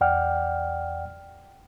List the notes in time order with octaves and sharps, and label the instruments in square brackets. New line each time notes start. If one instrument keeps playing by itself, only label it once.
[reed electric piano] E2 D5 F#5 G5 F6